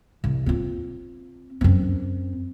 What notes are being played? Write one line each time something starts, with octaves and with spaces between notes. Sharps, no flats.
C2
C4 F4
F#2 C4